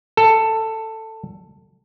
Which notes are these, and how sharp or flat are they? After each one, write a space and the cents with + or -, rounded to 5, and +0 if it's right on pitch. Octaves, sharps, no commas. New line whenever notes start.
A4 +10